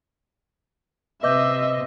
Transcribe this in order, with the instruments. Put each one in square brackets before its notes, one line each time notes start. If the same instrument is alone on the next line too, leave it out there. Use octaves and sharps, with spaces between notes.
[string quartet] C3 [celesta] B4 D6 G6 [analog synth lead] D#5 [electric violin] E5